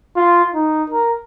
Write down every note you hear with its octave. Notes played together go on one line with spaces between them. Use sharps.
F4
D#4
A#4